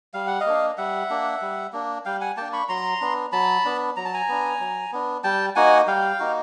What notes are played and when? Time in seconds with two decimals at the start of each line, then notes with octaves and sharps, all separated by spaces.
0.14 G3 F5
0.27 F#5
0.40 D#5 F5
0.46 A#3 D4
0.78 G3 E5 F#5
1.10 A#3 D4
1.41 G3
1.73 A#3 D4
2.05 G3 F5 G5
2.21 F#5 G#5
2.37 A#3 D4 G5 A5
2.53 B5 C#6
2.69 F#3 A#5 C6
3.01 B3 D4
3.32 F#3 A5 B5
3.65 B3 D4
3.96 F#3 A#5
4.05 A5
4.14 G#5 A#5
4.28 B3 D4
4.60 F#3
4.92 B3 D4
5.24 G3 G5 A5
5.56 A#3 D#4 F#4 F#5 G#5
5.87 G3 F5 G5
6.19 A#3 D#4 F#4